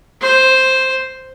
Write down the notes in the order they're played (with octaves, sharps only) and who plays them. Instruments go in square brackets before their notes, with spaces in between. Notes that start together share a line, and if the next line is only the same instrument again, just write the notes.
[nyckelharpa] C5